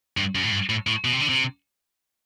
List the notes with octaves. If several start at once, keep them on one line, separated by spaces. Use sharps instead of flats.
G2
F#2
A2
G2
A2
A2
B2
C3
D3
C3